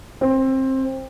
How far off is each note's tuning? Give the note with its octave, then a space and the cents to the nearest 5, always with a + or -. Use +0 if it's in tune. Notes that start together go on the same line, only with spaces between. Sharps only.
C4 +20